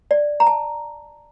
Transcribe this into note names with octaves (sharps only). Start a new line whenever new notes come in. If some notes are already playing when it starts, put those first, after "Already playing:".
D5
A#5
A5